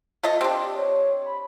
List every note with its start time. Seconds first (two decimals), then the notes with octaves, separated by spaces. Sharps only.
0.23 A3 F4 D#5
0.41 C4 D4 G4
0.75 C#5
1.26 B5